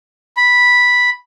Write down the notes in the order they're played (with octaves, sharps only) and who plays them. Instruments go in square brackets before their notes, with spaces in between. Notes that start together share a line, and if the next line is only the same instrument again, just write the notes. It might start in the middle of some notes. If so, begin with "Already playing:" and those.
[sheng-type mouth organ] B5